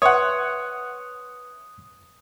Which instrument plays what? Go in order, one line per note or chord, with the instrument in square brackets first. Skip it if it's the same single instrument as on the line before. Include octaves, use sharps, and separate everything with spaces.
[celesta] B4 E5 C6 [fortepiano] C#5 F#5 [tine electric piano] D#6